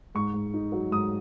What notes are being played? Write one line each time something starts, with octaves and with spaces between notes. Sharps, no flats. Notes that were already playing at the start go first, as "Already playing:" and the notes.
G#2 C#6
G#2
D#4
F#3
G#2 D#6